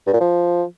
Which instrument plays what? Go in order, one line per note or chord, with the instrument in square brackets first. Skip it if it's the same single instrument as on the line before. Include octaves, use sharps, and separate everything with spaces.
[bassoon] G2
A#2
F3